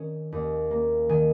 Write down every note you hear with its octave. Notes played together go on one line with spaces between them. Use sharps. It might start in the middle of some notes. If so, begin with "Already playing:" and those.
Already playing: D#3 C#4
D#2
A#3
D#3 G#5